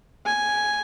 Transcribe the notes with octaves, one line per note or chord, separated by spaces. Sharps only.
G#5